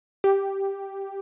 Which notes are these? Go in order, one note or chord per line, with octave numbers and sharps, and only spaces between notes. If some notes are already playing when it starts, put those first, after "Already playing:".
G4